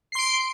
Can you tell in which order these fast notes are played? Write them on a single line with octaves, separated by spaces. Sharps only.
C7 C6 D7